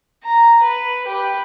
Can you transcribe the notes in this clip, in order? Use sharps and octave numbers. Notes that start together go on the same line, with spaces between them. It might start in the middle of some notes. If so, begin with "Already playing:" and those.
A#5
B4
G4 B4